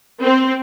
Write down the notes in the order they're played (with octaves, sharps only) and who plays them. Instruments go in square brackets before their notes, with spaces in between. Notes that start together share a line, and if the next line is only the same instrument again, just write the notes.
[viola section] C4